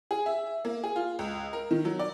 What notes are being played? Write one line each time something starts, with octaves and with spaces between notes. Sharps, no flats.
G#4
E5
A#3
G#4
F4
C#2
A#4
D#3
F#3
D5